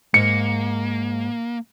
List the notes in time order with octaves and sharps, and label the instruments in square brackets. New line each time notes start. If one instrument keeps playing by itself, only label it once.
[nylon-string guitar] G#2 [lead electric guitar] A#3 [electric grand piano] C#7